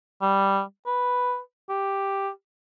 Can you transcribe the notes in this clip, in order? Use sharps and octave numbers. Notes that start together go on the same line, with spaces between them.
G3
B4
G4